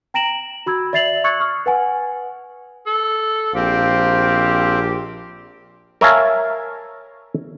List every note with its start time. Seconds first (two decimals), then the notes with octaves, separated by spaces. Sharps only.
0.14 G5 A#5 A#6 D7 E7 F#7
0.66 F#4 B5 E6 G#6
0.93 D5 E5 A6 C7 F7 F#7
1.24 C#6 E6 F#6 G#6 A6 C#7
1.40 C#6 D#6 F6
1.66 B4 F#5 G#5
2.87 A4
3.55 A#1 C4 G4 F5
6.01 A#4 C#5 E5 F5 G#5 A5